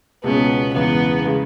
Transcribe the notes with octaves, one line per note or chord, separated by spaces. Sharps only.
C#2 B2 G#3 B3 C#4
E2 C#3 G#3 B3
C#3 G#3